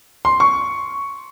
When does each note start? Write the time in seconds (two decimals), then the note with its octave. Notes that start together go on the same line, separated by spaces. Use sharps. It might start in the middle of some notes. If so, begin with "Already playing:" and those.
0.25 C6
0.40 C#6